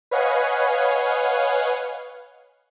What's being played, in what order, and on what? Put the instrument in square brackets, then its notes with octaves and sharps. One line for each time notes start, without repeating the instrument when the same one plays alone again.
[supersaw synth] B4 C#5 D#5 F5 F#5 G#5